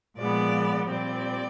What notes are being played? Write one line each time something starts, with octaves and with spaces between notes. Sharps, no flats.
A#2 F3 G#3 B3 D5
A#2 G3 C4 D5